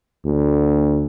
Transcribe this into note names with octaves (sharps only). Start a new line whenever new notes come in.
D2